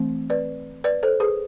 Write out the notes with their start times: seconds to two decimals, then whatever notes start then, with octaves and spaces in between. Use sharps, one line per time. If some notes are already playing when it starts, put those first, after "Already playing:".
Already playing: E3 A3 C4
0.30 B4 D5
0.84 B4 D5
1.03 A4 C5
1.20 G#4 B4